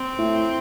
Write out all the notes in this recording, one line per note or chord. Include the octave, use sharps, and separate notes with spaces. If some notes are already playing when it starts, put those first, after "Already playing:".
Already playing: C4
A2